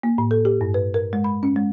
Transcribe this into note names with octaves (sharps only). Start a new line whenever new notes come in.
A#3
A2
A4
G4
G2
B4
A#4
G#3
B5
C#4
G#3